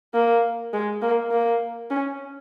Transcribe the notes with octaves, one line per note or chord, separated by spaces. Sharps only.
A#3
G#3
A#3
A#3
C#4